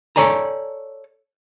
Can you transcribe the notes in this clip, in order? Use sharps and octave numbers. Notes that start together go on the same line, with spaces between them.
A4 C#5 D5 G#5 A#5